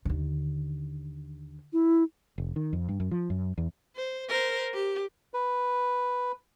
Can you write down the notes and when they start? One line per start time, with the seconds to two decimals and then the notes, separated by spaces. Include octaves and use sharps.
0.05 D#2 D3
1.73 E4
2.38 F1
2.56 D#3
2.73 F2
2.89 G2
3.00 F#2
3.11 F3
3.30 F#2
3.58 E2
3.96 C5
4.29 A#4 C5
4.74 G4
5.34 B4